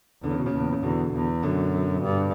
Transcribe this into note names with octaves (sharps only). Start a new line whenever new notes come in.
E2 D3
C#3
B2
A#2 C#3
E2
C#3
E2 B2 D3
E2
F#2 B2 D3
G2